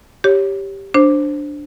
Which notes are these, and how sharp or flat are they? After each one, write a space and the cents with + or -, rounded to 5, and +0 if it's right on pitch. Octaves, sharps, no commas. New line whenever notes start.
G4 +0 C#5 +0
D4 +0 C5 +5